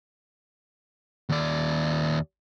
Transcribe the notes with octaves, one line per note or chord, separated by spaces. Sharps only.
D#2 D5